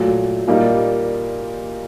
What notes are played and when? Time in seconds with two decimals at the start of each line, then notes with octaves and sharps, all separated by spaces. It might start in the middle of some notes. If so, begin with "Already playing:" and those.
Already playing: A#2 F#3 A3
0.47 A#2 G3 A#3 D#4